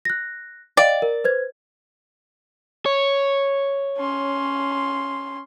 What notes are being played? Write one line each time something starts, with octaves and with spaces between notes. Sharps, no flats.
F#6 A#6
D5 D#5 F5 G5
A#4
B4 C5 G#6
C#5
C#4 C6